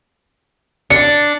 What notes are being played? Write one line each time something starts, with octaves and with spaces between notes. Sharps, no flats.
D4 C#7